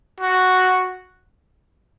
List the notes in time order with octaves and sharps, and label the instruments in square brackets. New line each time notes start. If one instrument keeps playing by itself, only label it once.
[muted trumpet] F#4